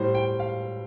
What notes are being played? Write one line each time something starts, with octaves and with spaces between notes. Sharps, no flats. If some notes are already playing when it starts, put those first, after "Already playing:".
Already playing: A2 G3 C5
G5
F5